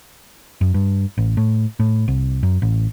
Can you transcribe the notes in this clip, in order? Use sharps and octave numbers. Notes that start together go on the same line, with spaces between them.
F#2
G2
A1
A2
A2
C2
F#2
A1